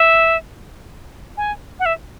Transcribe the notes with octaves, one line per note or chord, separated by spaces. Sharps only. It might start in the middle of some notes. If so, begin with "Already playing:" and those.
Already playing: E5
G#5
F#5
E5